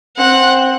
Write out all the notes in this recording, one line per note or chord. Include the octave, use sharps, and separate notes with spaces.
C4 F#5